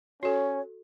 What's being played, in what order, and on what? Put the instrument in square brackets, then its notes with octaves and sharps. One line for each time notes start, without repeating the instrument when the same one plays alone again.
[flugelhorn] C#4 [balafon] F#4 A4 [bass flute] C#5